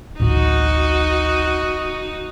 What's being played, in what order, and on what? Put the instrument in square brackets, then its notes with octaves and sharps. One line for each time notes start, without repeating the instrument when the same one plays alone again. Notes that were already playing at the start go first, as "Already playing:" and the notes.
[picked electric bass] D1 A1 [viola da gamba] D#4 F#4